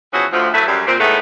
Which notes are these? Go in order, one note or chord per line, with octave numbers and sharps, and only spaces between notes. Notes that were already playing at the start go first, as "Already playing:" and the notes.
B2 E3 F3 C#4 F#4 G#4
D2 F3
F#3 A3 E4 B4
F#2 G3
A#2 C4
A2 D#3 G#3 A3 B3